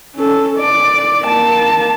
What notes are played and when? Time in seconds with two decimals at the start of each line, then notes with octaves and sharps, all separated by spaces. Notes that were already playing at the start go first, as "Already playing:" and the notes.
0.16 C#4 A4
0.59 D5
1.24 A#3 A5